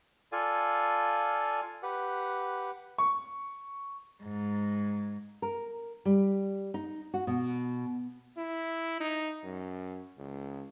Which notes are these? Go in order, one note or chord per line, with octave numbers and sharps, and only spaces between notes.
F4 A4 D5 F5 G#5
G4 B4 F#5
C#6
G#2
A#4
G3
D#4
F#4
B2
E4
D#4
F#2
C#2